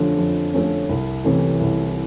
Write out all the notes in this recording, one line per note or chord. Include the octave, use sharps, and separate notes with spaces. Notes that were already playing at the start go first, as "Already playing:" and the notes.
Already playing: F2 D3 F3 A3 C#4
F2
D3 F3 A3 C#4
C2
C3 E3 A3 C#4
C2